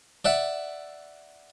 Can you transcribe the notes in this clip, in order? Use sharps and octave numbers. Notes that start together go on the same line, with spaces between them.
D5 E5 F#5